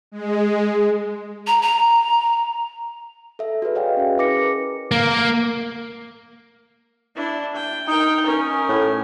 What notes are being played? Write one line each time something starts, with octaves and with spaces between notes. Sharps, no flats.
G#3
A#5
A#5
A4 E5
F#4 G#4 B4 D5
C#5 D#5 F5 G5 G#5
C#4 G#4
E4 G#4 B4 D6 A#6 C#7
A#4
A#3
D4 E4
G5
D#4 A#4 G5
C#4 A#4
A2